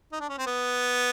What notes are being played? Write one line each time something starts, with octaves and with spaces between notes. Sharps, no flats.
D#4
D4
C#4
C4
B3